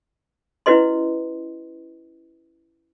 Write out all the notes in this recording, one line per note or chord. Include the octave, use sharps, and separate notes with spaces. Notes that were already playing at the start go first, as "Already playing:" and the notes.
C#4 E4 F#4 B4 D#5 C6